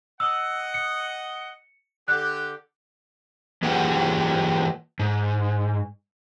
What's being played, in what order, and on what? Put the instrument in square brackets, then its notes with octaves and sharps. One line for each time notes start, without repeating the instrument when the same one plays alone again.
[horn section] D#5 F#5 [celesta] E6
[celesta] C#7
[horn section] D3 G4 [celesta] F#6
[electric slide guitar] E3 A#3 F4 G4 G#4 F#5
G#2